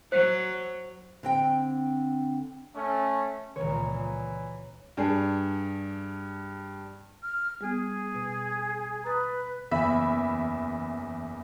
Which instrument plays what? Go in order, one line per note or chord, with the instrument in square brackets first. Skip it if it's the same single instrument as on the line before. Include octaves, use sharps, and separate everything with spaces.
[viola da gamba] F#3 [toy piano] C5
[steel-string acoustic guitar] D3 C4 G5
[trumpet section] A3 C#4
[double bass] C#2 A#2 [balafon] D#3 [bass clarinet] E3 [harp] C#5 A#5
[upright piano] G2 D4 G#4
[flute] F6
[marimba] G3 B3 [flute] G#4
[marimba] B2
[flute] B4 [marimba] A#5 D#6 A6
[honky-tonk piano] F#1 E2 E5 B5